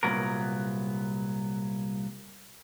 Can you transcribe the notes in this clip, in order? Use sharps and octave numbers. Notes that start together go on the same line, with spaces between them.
C2 F2 A#2 F#3 B3 A#4